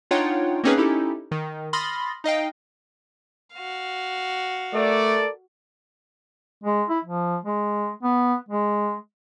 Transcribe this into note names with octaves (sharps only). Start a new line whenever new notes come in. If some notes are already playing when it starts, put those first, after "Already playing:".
D4 D#4 F4 C#5 F#5 G5
A#3 C4 C#4 D#4 G#4 B4
C#4 D#4 E4 G4 A4
D#3
B5 C6 D#6 F6 A6 A#6
D#4 D#5 F5 G5
F#4 F5
A3 A4 A#4 D5
G#3
E4
F3
G#3
B3
G#3